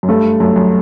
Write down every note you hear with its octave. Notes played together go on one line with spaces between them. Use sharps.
F#2
G2 A3
F#2 A3
F#2